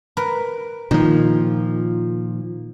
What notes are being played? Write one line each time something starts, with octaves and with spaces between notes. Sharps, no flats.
A#4 B4
A#2 D#3 F3